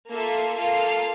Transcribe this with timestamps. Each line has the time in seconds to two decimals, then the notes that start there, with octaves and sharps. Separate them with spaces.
0.10 A#3 F4 A4 E5
0.57 A#3 F4 A4 F5